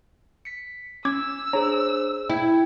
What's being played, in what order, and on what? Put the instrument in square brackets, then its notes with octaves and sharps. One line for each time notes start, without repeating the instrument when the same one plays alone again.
[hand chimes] B6 C#7
[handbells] C#4 D6 G#6 [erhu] E6
[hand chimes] D4 G#4 C5 [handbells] C#5 A#5
[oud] E4 [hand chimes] G5 G#6